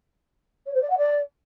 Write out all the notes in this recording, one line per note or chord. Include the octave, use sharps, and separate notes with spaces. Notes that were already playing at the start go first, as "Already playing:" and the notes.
C#5
C5
D5
F#5
D5